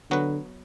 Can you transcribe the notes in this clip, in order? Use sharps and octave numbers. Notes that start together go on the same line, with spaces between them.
D3 F#3 B3 F#4 B4